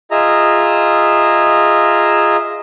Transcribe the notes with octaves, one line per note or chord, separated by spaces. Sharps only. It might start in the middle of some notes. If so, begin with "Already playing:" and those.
F4 G#4 D#5 E5 A#5